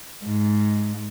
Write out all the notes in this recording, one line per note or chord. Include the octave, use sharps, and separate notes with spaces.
G#2